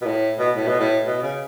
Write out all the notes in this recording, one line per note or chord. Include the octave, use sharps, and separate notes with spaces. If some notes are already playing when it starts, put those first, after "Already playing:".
B2
A2
B2
A2
B2
A2
B2
C#3